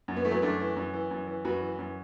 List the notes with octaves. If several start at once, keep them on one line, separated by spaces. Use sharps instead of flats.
F#2
B3
E3 A3
F#3 B3
F#2 A3 D4
E3
F#2
E3
F#2
E3
F#2 F#4 B4
E3
F#2